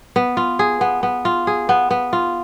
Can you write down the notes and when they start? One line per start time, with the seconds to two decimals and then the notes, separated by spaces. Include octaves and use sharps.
0.16 B3
0.37 F4
0.59 G#4
0.81 B3
1.03 B3
1.25 F4
1.47 G#4
1.69 B3
1.91 B3
2.13 F4